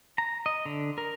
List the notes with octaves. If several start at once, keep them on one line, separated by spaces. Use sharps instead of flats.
A#5
D#5
D3
A#4